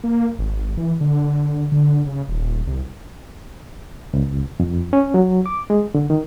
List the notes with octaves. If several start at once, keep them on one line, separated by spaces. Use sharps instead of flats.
A#3
G#1
E3
D3
D3
C#3
D#1
C2
C#2
F2
C#4
F#3
D6
G#3
D3
D#3